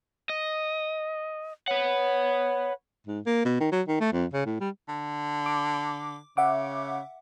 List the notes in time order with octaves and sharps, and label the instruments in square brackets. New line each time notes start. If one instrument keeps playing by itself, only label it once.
[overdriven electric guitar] D#5
[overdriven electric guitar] B4 F#5 [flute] C#5
[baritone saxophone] G#2
A#3
B2
D#3
F#3
D#3
A3
F2
C#3
A2
G3
D3
[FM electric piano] D6
[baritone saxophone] C#3 [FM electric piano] E5 F#5 D6